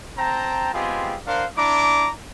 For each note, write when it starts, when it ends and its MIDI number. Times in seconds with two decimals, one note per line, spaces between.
0.18 0.69 60
0.18 0.69 79
0.18 0.69 81
0.18 0.69 82
0.73 1.16 56
0.73 1.16 59
0.73 1.16 60
0.73 1.16 65
0.73 1.16 67
0.73 1.16 68
1.27 1.45 62
1.27 1.45 70
1.27 1.45 72
1.27 1.45 77
1.27 1.45 78
1.56 2.09 62
1.56 2.09 64
1.56 2.09 82
1.56 2.09 86